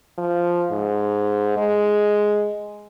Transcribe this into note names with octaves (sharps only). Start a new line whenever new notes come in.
F3
G#2
G#3